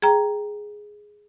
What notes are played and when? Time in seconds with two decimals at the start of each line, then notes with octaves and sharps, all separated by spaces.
0.02 G#4 G5 A#5